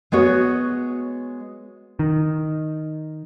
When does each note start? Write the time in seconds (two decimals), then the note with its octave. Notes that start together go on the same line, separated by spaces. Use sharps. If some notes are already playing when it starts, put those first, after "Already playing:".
0.12 G#3 B3 F#4 C#5
1.99 D#3